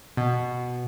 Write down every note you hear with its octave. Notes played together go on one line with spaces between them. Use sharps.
B2